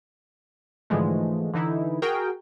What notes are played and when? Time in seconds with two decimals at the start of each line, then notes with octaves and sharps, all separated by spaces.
0.90 G#2 D3 E3 F3 G#3 A3
1.54 D3 E3 D#4 E4
2.02 F#4 G#4 A#4 G5